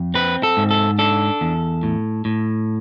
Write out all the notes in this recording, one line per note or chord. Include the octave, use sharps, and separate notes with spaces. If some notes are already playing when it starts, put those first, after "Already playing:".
Already playing: F2
C4 B4
A4
G#2
A4
D4 A4
E2
A2
A2